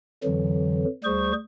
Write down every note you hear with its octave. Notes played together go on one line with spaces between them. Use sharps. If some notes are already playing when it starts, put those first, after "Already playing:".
F2 D3 E3 F#3
D2 G3 G#4 C5 C#6